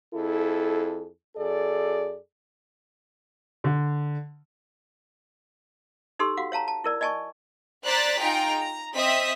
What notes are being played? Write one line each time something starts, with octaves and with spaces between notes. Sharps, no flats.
F2 E4 G#4 A4
F#2 G#4 A4 D5
D3
D#4 G4 A4 C6 E6
F#4 F5 F#5
C#5 F5 A5 A#5
A5
E4 A#4 D5
D5 D#5 G#5 A5 C#6
C5 D5 A#5 F#6 A6 B6
D#4 F4 G#4 G5 A#5
A#5
C4 D#5 E5 D#6 B6